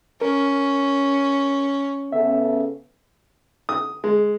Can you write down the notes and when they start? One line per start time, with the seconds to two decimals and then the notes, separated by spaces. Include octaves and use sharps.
0.21 C#4 A#4
2.12 C#3 B3 A4 E5
3.69 D#6
4.04 G#3